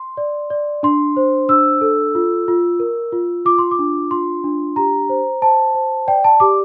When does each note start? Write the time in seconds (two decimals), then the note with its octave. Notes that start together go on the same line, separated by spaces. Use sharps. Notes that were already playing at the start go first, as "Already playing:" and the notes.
Already playing: C6
0.17 D5
0.50 D5
0.83 D4 C6
1.17 C5
1.49 D4 E6
1.81 A4
2.15 F4
2.48 F4
2.80 A#4
3.12 F4
3.45 F4 D6
3.58 C6
3.71 D6
3.79 D4
4.11 F4 C6
4.44 D4
4.76 G4 A#5
5.09 C5
5.42 C5 A5
5.75 C5
6.07 D5 G5
6.24 A5
6.40 G4 D6